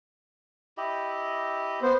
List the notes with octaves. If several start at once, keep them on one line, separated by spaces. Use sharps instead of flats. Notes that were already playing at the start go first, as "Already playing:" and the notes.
E4 G4 D#5
B3 C5